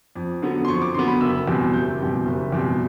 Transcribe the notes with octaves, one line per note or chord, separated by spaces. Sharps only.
F2
D3 F#3 B3
C6
F2 C#6
D6
D3 F#3 B3 C6
B5
F#1 E6
E2 B2 G3 C4
F#1 G6
E2 B2 G3 C4
F#1
E2 B2 G3 C4